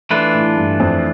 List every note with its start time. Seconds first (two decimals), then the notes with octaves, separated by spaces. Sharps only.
0.11 E3 A3 D4 F4 B4
0.34 A2
0.57 G2
0.80 F2